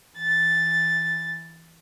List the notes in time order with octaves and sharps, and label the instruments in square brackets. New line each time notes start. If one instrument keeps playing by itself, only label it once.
[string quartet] E3 A6